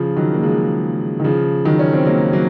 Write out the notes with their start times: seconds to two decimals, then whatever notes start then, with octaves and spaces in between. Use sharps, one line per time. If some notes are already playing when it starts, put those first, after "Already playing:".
Already playing: C#3 F3
0.17 D#3 F#3
0.34 A#3
0.43 F3 G#3
1.20 D#3
1.24 C#3 F3
1.65 D#3 F#3
1.79 C#4
1.93 C4
2.05 F#3 A#3
2.33 F#3 A#3